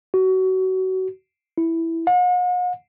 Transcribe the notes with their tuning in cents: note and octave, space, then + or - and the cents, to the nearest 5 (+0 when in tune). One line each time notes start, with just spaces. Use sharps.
F#4 +25
E4 +0
F#5 -45